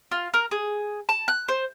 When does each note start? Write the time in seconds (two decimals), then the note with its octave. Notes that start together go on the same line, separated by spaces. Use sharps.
0.11 F4
0.34 A#4
0.51 G#4
1.09 A5
1.28 F#6
1.48 C5